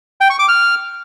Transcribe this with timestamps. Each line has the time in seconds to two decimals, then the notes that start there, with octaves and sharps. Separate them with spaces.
0.21 G5
0.30 C#6
0.39 D6
0.48 F6